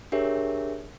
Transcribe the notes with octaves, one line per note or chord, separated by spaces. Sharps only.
D4 G4 G#4 A#4 C#5 E5